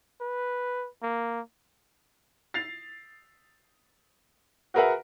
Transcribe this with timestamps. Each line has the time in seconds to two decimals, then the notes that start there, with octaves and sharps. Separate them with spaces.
0.21 B4
1.03 A#3
2.54 A6 C7 F7
4.74 F#4 G#4 A#4 B4 E5 F#5